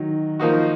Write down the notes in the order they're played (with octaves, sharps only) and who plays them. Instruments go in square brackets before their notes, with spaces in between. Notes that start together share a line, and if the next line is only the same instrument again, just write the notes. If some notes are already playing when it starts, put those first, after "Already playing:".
Already playing: [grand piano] D#3 F#3
[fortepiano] F3 A#3 D#4 F#4